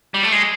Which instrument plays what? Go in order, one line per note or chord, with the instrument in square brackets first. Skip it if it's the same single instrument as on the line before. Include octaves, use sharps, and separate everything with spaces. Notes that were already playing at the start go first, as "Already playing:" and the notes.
[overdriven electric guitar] G3
A3
G#3